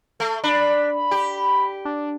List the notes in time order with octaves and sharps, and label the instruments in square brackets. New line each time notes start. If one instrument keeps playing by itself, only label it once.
[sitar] A3
[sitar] D4 [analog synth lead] B5
[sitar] G4
[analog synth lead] D4